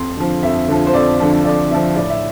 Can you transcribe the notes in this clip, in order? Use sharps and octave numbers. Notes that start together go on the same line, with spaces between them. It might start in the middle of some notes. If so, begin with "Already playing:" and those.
Already playing: F2 C6
D3 F3
F2 E5
D3 F3
C5
F2 D5
D3 F3
F2 D5
D3 F3 E5
A2 D5
E5